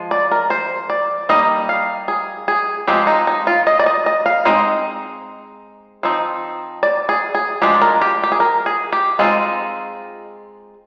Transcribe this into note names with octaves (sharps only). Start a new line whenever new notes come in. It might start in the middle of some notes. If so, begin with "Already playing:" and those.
Already playing: F3 G#3
D5
A#4
C5
D5
G3 A#3 D#4 D#5
F5
G#4
G#4
F3 G#3 C4 G4
D#4
D#4
F4
D#5
D5
D#5
D#5
F5
G#3 C4 D#4 D#5
F3 C4 D#4
D5
G#4
G#4
F3 G#3 D4 G4
A#4
G4
G4
G#4
A#4
G#4
G4
G#3 C4 D#4 F4